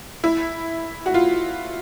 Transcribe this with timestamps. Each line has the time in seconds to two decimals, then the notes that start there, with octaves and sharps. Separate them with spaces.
0.24 E4
1.06 F#4
1.14 F4